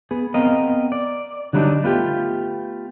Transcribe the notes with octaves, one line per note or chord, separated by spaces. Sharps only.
B3 G#4
B3 C4 A#4 D#5 F5
D5
D3 F#3 G3 C4 D4 D#4
A3 B3 F4 G4